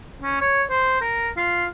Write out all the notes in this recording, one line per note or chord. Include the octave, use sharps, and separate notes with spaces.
C#4
C#5
C5
A#4
F4